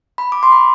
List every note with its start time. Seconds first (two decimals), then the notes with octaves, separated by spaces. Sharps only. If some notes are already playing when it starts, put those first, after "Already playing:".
0.18 B5
0.32 D6
0.43 C6
0.52 B5